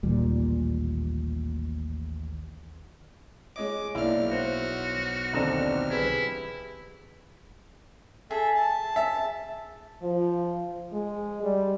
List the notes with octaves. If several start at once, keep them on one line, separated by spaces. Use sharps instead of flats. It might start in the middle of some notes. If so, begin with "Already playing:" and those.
A1 D#2 A#2 G3
G#3 C#5 D#5 D6
B1 A#3 D4 E4 F6
F#3 F#4 C5
D#2 D3 C4 D4 D#4 E7
E4 G4 G#4 B4
G#4 A4 E5
A5
E5
F3
G#3
G3